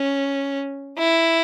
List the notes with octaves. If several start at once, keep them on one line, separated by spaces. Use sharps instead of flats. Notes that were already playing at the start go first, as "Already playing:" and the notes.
Already playing: C#4
E4